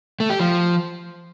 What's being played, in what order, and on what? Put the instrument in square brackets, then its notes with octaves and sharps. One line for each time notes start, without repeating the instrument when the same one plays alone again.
[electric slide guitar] A3
G4
F3